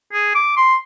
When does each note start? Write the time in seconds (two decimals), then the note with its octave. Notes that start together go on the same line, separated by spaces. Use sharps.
0.13 G#4
0.35 D6
0.57 C6